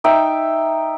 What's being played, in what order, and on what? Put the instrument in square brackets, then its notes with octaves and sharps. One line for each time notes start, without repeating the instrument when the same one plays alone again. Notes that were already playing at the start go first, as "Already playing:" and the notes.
[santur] D#4 E5 G5